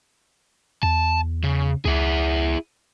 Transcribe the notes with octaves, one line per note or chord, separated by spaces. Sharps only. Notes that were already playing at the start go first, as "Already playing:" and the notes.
E2 A5
C#3
C#2 E4 G#4